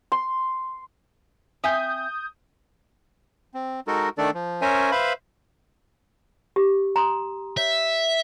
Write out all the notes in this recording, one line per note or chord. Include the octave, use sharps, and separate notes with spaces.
C6
C4 E5 G#5 D#6 G6
C4
G#3 D#4 F#4 A4 A#4
D#3 A3 D4 A4 D5
F3
C#4 A#4 C5 C#5 E5 G#5
B4 C5 E5 F5 B5
G4
A#5 C6 D#6
C#5 E5